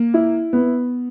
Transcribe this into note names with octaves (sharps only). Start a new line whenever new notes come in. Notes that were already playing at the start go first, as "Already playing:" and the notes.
Already playing: A#3
E4
B3